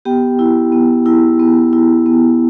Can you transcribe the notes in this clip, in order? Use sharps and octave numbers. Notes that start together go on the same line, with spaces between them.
B3 G4 G5
E4
B3
E4
B3
E4
B3